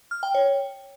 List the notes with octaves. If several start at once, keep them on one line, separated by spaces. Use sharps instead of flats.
F6
G5
C#5